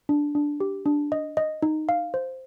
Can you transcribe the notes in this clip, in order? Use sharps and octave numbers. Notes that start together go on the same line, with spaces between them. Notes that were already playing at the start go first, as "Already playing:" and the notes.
D4
D4
G4
D4
D#5
D#5
D#4
F5
C5